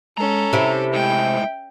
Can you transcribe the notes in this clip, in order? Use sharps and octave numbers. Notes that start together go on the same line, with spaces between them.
G#3 C#4 A4 A#5
C3 E4 E5
A2 G#3 G5